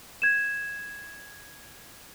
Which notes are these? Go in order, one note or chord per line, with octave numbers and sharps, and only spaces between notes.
G#6 E7